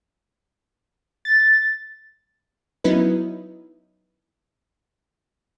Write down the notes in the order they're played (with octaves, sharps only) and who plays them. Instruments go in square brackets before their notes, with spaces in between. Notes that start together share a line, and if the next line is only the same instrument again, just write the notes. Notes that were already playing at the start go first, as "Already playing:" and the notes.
[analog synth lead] A6
[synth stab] F#3 B3 C#4 D#4 E4 B4